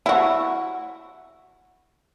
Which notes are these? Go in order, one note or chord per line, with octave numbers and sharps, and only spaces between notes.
E4 F#4